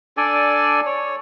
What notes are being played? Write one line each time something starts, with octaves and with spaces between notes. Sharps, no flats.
D4 A4 D5 G#5
C#5